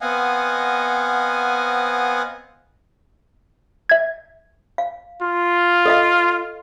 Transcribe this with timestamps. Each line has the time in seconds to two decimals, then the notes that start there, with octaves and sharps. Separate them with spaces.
0.01 B3 C4 D#5 F5 F#5 G#5
3.90 E5 G#6
4.78 F5
5.22 F4
5.86 A4 D#5 F5